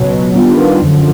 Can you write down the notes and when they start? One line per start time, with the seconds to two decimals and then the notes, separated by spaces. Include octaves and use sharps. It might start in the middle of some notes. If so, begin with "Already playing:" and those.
Already playing: C#2 B2 F#3
0.33 D#3 G3 B3 D4 F4
0.81 F#2 D3 F3